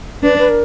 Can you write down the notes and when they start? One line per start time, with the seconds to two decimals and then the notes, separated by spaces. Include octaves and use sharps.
0.23 D4 B4
0.38 B4
0.49 A#4